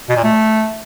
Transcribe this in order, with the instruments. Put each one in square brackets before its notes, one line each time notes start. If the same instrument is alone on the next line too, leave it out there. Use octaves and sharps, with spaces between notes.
[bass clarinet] B2
A#2
A3